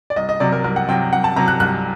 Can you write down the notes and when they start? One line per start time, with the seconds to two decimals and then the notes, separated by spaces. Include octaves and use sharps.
0.10 D5
0.16 C2 D#5
0.29 D#5
0.40 C3 F#3 D5
0.52 A#4
0.64 C2 A#4
0.76 F#5
0.88 C3 F#3 G5
1.12 C2 F#5
1.24 A5
1.36 C3 F#3 A#5
1.48 F#6
1.60 C2 F#6